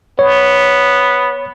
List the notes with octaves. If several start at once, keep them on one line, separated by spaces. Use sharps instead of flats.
B3 C#5